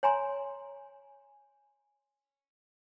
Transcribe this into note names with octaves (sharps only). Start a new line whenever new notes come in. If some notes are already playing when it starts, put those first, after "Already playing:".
C#5 G#5 A#5 C6